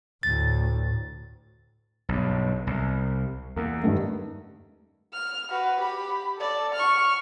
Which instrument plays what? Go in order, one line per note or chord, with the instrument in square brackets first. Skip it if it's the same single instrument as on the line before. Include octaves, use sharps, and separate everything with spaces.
[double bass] D2 A2 [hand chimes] A6
[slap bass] B1 G2
C2
[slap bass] E2 [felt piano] A#3
[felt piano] G2 D#3 A3
[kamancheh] F6
F#4 B4
G4 B5
A4 D5
C#6 F6